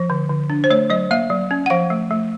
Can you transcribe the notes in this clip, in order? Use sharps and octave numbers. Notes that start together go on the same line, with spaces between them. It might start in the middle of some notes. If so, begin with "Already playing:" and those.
Already playing: F3
D3
D3
D4
C5
A3 C#5
F#3 D#5
A#3 E5
F#3
C#4
F#5
F3 F5
A3
A3